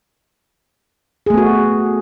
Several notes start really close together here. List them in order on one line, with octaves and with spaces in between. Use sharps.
G#4 A3 B3 F#4